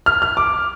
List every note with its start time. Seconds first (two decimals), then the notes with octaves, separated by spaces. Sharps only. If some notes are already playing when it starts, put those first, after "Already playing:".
0.06 F6
0.22 F6
0.37 D6